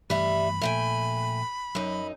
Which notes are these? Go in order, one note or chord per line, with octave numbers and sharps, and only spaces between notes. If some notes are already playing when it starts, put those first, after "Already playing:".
G2 E3 G3 A3 E5 B5
A#2 F3 A3 G5 G#5
F#2 F#3 D#4